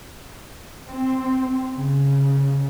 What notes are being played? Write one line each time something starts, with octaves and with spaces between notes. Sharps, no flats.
C4
C#3